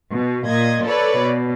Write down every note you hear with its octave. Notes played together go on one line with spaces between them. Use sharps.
B2
A#2 D#5 G#6
A4 B4 C#5 D5
B2